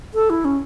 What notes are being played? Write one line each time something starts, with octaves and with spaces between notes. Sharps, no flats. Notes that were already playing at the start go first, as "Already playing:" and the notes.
A4
E4
C#4